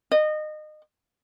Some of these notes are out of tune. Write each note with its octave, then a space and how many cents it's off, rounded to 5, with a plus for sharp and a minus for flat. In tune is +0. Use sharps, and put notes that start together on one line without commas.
D#5 -25